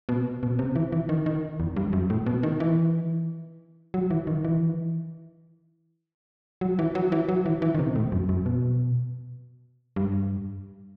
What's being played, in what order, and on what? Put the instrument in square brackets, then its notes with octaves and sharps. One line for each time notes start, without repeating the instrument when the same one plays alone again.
[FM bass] B2
B2
C3
E3
E3
D#3
D#3
E2
G2
F#2
A2
B2
D#3
E3
F#3
E3
D#3
E3
F#3
E3
F#3
E3
F#3
E3
E3
D#3
C3
A2
F#2
F#2
B2
G2